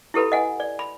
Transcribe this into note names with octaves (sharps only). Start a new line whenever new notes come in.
E4 G4 A4 B4 B5
D#5 F#5 G#5
D5
B5